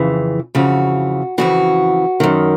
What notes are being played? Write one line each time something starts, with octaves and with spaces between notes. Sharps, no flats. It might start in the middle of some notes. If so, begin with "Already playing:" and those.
Already playing: F2 C#3 E3
F2 C#3 E3 F#4
F2 C#3 E3 F#4
F#2 D#3